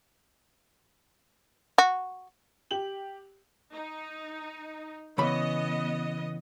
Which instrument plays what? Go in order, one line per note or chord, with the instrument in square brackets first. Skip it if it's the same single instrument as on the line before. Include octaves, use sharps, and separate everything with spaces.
[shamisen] F#4
[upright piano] G4 F#7
[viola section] D#4
[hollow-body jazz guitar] C#3 E3 B5 [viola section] B3 D#5